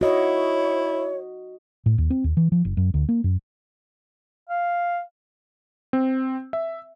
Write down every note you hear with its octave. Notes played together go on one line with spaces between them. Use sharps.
E4 F#4 C#5 D#5
A2
D#2
C4
D#2
E3
F3
F#1
F#2
D2
A#3
F#2
F5
C4
E5